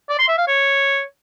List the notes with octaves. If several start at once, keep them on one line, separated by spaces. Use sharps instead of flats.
D5
C6
E5
F5
C#5